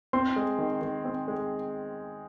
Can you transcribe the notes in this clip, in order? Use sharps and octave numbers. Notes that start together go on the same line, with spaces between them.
C4 C6
G#3
D#3
D#3
C4
G#3